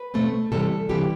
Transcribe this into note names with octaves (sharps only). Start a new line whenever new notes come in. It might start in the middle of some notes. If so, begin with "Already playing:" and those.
Already playing: B4
B2 A3 C4
C3 E3 G3 A4
C3 E3 G3 G4